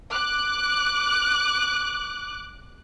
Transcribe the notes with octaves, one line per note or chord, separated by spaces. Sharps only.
D6 F#6